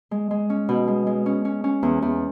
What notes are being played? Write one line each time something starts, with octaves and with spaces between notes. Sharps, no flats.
G#3
G#3
C#4
B2
G#3
G#3
C#4
C#4
C#4
E2
E2